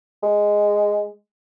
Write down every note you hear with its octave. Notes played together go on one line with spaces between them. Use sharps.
G#3